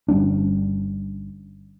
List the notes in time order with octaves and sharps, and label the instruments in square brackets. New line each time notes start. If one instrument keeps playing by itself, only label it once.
[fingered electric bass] G1 G3 C#4 D4